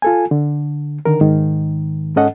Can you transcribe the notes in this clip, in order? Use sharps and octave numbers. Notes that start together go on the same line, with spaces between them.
F4 A4 G#5
D3
D3 D#3 A#4
G#2 D#3
G#2 C#4 A4 D#5 F#5